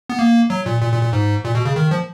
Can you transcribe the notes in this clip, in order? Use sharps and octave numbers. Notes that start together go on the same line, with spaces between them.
B3
A#3
F#3
A#2
A#2
A#2
A#2
G#2
A#2
B2
C#3
D#3
F3